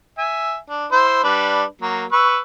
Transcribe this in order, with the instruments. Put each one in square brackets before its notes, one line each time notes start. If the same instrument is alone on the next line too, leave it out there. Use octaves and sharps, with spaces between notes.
[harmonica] E5 G#5
D4
E4 C5
G3 D4 B4
F#3 A#3
B4 C#6 E6